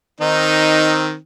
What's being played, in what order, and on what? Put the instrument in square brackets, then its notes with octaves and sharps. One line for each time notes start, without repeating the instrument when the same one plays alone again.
[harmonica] D#3 C4 D#4